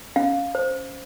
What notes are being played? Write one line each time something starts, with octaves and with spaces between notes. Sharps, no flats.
C#4 F5
C5